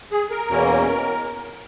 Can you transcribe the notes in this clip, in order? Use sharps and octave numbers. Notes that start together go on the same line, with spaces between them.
G#4
A#4
E2 B2 A#3 C#4